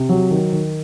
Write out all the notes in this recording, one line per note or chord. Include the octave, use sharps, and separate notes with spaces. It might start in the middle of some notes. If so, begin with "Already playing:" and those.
Already playing: C3
F#3
D#3
D#3